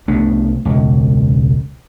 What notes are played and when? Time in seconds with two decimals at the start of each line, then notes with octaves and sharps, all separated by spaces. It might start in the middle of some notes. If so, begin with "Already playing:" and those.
0.08 C2 A3 B3 D4
0.65 E1 C#2